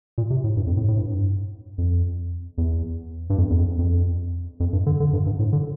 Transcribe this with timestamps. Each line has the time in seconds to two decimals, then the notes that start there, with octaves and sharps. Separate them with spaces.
0.18 A#2
0.30 C3
0.44 A2
0.57 G2
0.67 F2
0.77 A2
0.88 A2
0.97 G2
1.78 F2
2.58 E2
3.30 G2
3.38 F2
3.50 E2
3.59 F2
3.79 F2
4.60 F2
4.73 G2
4.86 D3
5.00 D3
5.13 G2
5.26 G2
5.39 A2
5.53 D3